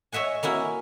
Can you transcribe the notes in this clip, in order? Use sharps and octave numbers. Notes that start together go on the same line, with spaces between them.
C#5 D#5 E5 F#5 G#5
A#3 C#4 E4 F#4